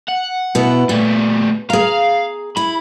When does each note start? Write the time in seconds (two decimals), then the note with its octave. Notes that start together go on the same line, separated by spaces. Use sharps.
0.08 F#5
0.55 B2 B3 E4
0.89 A#2 G3 A3
1.70 G#4 F5 A#5
2.57 E4 B5